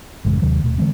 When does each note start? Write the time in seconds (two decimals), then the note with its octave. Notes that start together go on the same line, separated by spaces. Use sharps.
0.25 A1 F#2 C#3 G#3
0.42 D#2 C3 D#3 F#3
0.64 D#1 B2 A3
0.78 D3 E3 G#3 C4